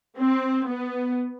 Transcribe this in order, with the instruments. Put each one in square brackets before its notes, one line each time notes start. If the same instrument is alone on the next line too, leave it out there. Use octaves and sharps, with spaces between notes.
[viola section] C4
B3